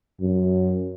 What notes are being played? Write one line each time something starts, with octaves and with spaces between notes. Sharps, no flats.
F#2